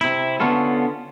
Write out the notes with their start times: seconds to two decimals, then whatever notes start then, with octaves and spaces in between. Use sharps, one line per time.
0.01 C3 E4
0.40 D3 B3 C#4 F4 A4